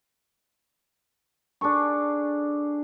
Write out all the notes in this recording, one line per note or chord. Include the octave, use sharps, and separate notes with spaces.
D4 G#4 A4 C#6